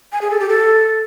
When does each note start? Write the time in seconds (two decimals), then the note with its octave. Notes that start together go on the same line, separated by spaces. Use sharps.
0.12 G#5
0.21 G#4
0.31 A4
0.40 G4
0.49 A4